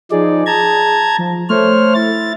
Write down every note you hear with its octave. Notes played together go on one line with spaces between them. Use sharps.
F3 D#4 G#4 D5
A5 A#5 G#6
F3
A3 C5 C#5 F6
E4 A6